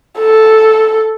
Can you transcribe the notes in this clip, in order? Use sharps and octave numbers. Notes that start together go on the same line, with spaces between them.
A4